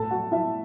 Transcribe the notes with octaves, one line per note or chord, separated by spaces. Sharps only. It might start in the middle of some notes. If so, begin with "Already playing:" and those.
Already playing: A2 A3 A4 A5
F#4 F#5
E4 E5